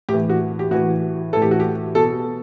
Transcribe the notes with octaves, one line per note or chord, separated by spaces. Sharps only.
A2 E3 G4
F#4
G4
A2 E3 F#4
A2 E3 A4
G4
F#4
G4
B2 A4